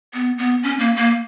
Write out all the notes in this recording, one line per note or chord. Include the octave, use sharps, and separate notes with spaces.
B3
B3
C#4
A#3
A#3